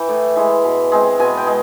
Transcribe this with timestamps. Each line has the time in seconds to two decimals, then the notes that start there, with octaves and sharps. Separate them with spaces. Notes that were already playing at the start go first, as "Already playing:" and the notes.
Already playing: E3 G5
0.09 A2
0.36 E3 G#3
0.64 B2
0.92 G#3 C4
1.19 B2 G#5
1.37 G5
1.47 G#3